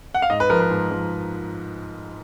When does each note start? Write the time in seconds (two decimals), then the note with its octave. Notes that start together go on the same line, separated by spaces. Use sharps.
0.15 F#5
0.22 F5
0.30 G#2 D#5
0.40 B4
0.50 F3 A#4
0.60 B4
0.71 G#2
0.91 F3